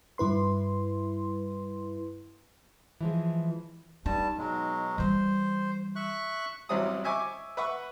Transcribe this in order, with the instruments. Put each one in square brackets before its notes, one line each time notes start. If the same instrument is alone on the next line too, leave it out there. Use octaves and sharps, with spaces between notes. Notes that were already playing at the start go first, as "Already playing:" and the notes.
[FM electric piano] G2 E4 B4 C6
[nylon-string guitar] E3 F3 G#3
[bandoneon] G2 G3 A5 [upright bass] D#4
[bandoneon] B2 F#3 G#3
[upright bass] E3 G3 [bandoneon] C5
[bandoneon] E5 C#6 F#6
[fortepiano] A1 F#3 G3 C4 E4 D#6
D#5 E5 G#5 C#6 D6
B4 E5 F#5 C#6